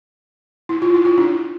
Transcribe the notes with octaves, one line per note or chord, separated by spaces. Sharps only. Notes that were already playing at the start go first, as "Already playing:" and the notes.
E4
F4
E4
F4
D4 E4